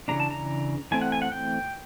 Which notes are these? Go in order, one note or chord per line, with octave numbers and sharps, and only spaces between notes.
C#3 E3 A3 D4 A#5
A5
A#5
E3 A3 C4 G#5
F#5
G#5
F#5
G5